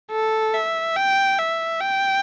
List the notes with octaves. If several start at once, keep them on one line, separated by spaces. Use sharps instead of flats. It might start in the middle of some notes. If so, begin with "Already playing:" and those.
A4
E5
G5
E5
G5